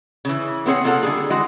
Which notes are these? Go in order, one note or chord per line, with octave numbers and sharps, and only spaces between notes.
C#3 E3
B3 C4 G#4 C5 C#5 F#5
C3 A#3 F4 A4 F#5 A#5
D3 G3 G#4
E3 G#3 F#4